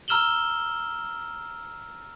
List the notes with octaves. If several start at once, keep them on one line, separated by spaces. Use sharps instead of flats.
A#5 E6 F6 E7 F#7 G7